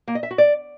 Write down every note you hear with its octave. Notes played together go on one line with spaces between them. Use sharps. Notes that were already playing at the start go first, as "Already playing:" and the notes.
A#3
D#5
E5
F#4
D5